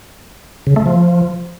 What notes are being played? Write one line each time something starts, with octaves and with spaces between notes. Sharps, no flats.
C#3
A3
F3